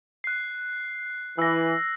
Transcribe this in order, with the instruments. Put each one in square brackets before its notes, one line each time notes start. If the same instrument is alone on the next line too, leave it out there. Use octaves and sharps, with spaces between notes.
[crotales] F#6 C7
[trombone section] E3 [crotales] E6 A#6